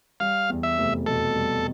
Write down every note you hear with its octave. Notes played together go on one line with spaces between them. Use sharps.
G3 F5
E2
E5
F1
B2 A4
G3